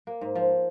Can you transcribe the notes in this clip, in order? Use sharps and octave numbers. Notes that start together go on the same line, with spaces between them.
A#3
G#2
F3